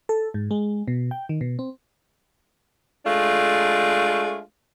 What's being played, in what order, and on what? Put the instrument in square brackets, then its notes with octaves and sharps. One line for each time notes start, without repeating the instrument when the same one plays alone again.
[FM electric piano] A4
G#2
G#3
B2
G5
D#3
B2
C4
[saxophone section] G#3 A3 D4 F4